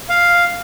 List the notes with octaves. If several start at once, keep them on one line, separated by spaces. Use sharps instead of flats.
F5